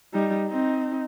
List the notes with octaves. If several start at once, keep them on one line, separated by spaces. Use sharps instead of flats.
G3 D#4
C4 D#4